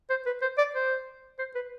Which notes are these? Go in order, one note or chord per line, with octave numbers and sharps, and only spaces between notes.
C5
B4
C5
D5
C5
C5
B4